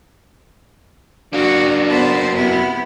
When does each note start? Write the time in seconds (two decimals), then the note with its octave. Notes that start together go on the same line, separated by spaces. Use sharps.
1.33 F#3 A#3 D4 F#4
1.87 B3 C5 A5
2.35 C3 B3 E4